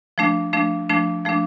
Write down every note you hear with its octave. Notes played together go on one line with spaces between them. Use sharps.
F3 A3 D4
F3 A3 D4
F3 A3 D4
F3 A3 D4